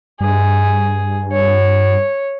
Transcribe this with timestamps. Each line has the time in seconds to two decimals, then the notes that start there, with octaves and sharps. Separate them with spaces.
0.20 G2 G#4
1.32 C#5